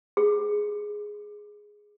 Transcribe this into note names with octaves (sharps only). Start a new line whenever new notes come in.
G#4